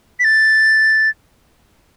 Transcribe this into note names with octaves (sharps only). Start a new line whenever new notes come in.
B6
A6